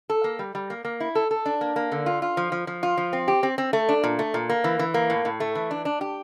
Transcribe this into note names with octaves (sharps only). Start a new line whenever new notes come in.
A4
A#3
G3
G3
A#3
A#3
E4
A4
A4
D4
A#3
A#3
D3
F4
F4
F3
F3
F3
F4
F3
C4
G4
C4
C4
A3
D4
A#2
A3
A#2
A#3
E3
E3
A#3
A2
A2
A3
E3
D4
D4
G4